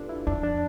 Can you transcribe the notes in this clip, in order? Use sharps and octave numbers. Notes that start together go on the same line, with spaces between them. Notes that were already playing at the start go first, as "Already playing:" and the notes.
Already playing: D4 F4 G4 A4 B4
E4
F2 D4
D4